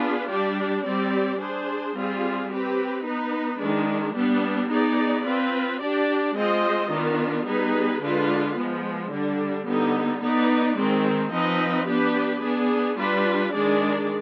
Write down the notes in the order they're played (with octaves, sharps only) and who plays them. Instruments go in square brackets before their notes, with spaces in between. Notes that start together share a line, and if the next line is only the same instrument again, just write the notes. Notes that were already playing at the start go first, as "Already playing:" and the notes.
Already playing: [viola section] B3 D4 F4 G#4 B4
G3 D4 G4 D5
G3 C4 G4 D5
D4 G#4 C5
G3 C4 F4 G#4
C4 G4 B4
B3 D#4 B4
D#3 G#3 D4
G3 B3 D4
B3 D#4 G#4 D5
C4 F4 B4
D4 G4 D5
G#3 C4 F4 C5 D#5
D#3 B3 D4 F4
G3 B3 D#4 G#4 B4
D3 G#3 D4 F4 B4
F3 G#3 B3
D3 G3 D4
D3 G3 B3 D#4
B3 D#4 B4 D5
D#3 G#3 C4
F3 C4 D#4 B4 D#5
B3 D4 G4 B4
B3 D4 G#4
G3 D4 F4 B4
D#3 G#3 D4 G#4 D5